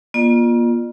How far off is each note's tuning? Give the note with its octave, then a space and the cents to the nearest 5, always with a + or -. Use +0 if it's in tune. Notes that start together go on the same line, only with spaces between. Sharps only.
A#3 +40 F4 +0 D5 +40